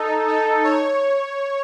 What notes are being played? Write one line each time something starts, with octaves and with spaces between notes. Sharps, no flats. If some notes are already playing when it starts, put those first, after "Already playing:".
Already playing: D#4 A4
D#4
C#5